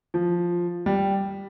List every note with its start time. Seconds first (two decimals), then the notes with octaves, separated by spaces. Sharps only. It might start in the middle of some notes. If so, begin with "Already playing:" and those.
0.14 F3
0.86 G3